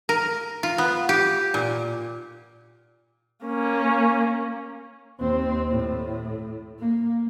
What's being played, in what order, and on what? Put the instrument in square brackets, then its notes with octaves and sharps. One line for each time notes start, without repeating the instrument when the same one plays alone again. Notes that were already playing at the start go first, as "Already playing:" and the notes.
[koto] A#4
F4
B3
G4
A#2
[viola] A#3 C#4
[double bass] D#2 C4
A2
A#3